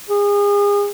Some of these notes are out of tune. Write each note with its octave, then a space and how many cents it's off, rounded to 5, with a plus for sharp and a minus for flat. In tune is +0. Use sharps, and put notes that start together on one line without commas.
G#4 -35